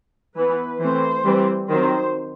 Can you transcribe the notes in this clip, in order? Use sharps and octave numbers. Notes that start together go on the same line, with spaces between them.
E3 B3 B4
E3 A3 C4 C5
E3 G3 C4
D#3 F#3 C4 C5